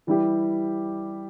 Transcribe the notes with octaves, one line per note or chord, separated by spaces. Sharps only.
E3 G3 E4 G4